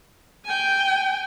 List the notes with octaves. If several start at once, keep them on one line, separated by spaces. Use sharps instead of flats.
G5 G#5